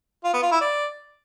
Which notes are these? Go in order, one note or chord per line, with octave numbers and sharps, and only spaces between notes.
F4
B3
F4
E4
D5